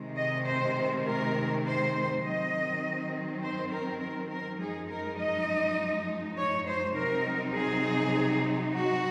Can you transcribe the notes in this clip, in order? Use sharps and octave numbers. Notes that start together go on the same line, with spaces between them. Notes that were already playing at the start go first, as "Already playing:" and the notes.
Already playing: C3 D#3 G#3 C4
D#5
C5
A#4
C5
D#3 F#3 C4 D#5
C5
A#4
A#4
A#4
F#2 F3 G#3 D#4 G#4
A#4
D#5
C#5
C5
C3 F#3 C4 D#4 A#4
G#4
F#4